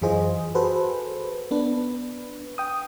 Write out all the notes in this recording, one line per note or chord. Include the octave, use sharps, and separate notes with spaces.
F#2 E3 F4 G#4 C5 D#5
F#4 G#4 A4 B4 C5
B3 D4 B4
G5 D#6